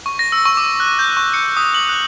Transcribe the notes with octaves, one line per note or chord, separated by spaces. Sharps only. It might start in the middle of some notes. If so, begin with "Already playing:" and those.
C#6
A#6
E6
C#6
D6
F#6
G6
C#6
C#7
D#6
F#7
F#6